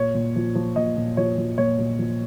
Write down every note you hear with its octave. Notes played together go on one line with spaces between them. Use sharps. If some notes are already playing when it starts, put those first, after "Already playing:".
Already playing: A#2 C#5
A#2
F3
F3
A#2 D#5
A#2
F3 C#5
F3
A#2 C#5
A#2
F3